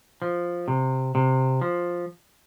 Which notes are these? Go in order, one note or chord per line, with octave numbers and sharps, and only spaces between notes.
F3
C3
C3
F3